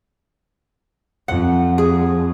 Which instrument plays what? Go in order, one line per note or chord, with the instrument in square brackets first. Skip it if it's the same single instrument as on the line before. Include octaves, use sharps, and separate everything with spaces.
[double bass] F2 [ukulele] F#5
[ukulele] G#4